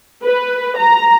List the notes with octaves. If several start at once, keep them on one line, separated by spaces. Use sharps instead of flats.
B4
A#5